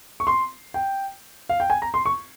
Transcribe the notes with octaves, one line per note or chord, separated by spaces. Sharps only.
C#6
C6
G5
F5
G5
G#5
A#5
C6
C#6